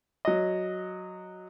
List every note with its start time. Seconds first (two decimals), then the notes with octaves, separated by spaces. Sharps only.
0.25 F#3 D#5